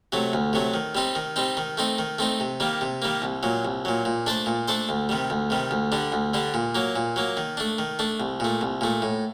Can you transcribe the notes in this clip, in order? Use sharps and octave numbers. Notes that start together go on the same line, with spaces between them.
C3 F#3 A3
D2
C3 F#3 A3
D#3
G3 C4 D#4
D#3
G3 C4 D#4
D#3
A3 C4 D#4
D#3
A3 C4 D#4
C3
D#3 G3 A#3
C3
D#3 G3 A#3
C2
A#2 F#3
C2
A#2 F#3
A#2
A3 D4 A4 C5
A#2
A3 D4 A4 C5
D2
C3 D#3 G3
D2
C3 D#3 G3
D2
D3 G3 D4
D2
D3 G3 D4
A#2
F#3 A#3
A#2
F#3 A#3
D#3
A3 D4
D#3
A3 D4
C2
A#2 A3
C2
A#2 A3
A2